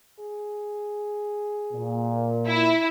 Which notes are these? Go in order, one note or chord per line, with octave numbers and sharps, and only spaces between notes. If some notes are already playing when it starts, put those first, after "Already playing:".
G#4
A#2
E4